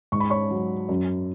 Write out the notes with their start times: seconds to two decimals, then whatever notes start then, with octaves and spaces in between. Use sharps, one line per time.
0.12 G#2 C#6
0.20 B5
0.30 C#5 C#6
0.50 F#3
0.89 F#2